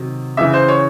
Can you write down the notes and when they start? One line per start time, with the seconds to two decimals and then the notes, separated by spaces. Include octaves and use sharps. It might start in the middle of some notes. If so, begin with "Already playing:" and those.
Already playing: C3 D#3 F#3
0.37 C#3 E3 E5
0.53 C5
0.68 C#5